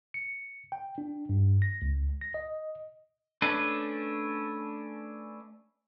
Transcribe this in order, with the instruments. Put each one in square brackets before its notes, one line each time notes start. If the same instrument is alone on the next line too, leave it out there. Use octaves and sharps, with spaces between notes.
[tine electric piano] C#7
G5
D4
G2
A#6
C#2
A#6
D#5
[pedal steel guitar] A3 C#4 D4 B4